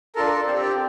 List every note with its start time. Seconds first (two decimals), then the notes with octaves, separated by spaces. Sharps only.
0.16 D4 F4 A4 A#4
0.31 A#4
0.47 C4 G4 C5
0.62 D5